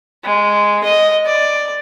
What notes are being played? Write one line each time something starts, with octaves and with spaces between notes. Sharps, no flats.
G#3
D#5
D5